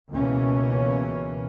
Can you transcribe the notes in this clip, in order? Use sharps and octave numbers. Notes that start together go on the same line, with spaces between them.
C#2 B2 E3 A#3 C#4